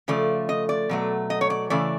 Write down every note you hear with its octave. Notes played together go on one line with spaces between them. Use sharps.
C#3 F3 A3 D5
D#5
D5
B2 F#3 A3
D#5
C#5
D5
C#3 E3 A3 D5